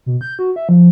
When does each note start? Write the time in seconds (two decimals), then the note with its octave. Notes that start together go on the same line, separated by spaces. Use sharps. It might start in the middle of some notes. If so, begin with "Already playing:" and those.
0.06 B2
0.21 G6
0.39 F#4
0.56 E5
0.69 F3